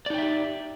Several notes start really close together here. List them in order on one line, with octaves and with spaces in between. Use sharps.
D5 D#4 G5 E5 G4